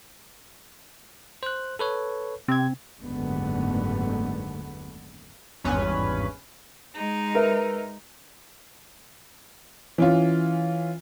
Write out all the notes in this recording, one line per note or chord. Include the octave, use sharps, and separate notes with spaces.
C5 F#6
A4 B4 C#5
C3 C4 G#6
F#1 D#2 G#2 D3 A3 B3
G#1 E2 G2 C#4 B4
G#3 D#4
A#4 B4 E5
E3 C#4 F4